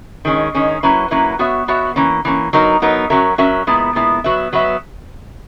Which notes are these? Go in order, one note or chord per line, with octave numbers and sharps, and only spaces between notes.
D#3 G#3 C#4
D#3 G#3 C#4
F#3 A#3 C#4 E4 B4
F#3 A#3 C#4 E4 B4
B3 F#4 C#5 E5
B3 F#4 C#5 E5
E3 A#3 C#4
E3 A#3 C#4
F#3 B3 D#4 A#4
F#3 B3 D#4 A#4
F#3 C#4 F#4 A#4 E5
F#3 C#4 F#4 A#4 E5
A#2 G#3 B3 E4
A#2 G#3 B3 E4
F#3 B3 F#4 B4 E5
F#3 B3 F#4 B4 E5